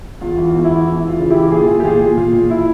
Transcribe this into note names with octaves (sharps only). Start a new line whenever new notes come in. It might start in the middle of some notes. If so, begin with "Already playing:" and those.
E2 F4
E3
F4
E2
E4
E3
E3
E3 F4
C#3
E3 E4 G4
A#2 F4 G#4
A#2
G4
A#2 F4 G#4
A#2
A#2 F4
A#2
A#2 E4